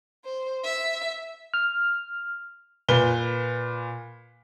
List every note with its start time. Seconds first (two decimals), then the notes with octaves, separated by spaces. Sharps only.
0.25 C5
0.64 E5
1.54 F6
2.89 A#2 B4 G7